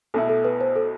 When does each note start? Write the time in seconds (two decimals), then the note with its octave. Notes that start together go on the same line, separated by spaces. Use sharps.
0.14 B1 B2 A3 E4 A4
0.29 A4
0.44 B4
0.61 C5
0.76 A4